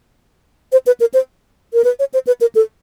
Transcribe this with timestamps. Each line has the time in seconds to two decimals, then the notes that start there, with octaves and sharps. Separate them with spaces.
0.72 C5
0.87 B4
1.00 A#4
1.14 C5
1.73 A#4
1.84 B4
1.99 C#5
2.14 C5
2.27 B4
2.41 A#4
2.55 A4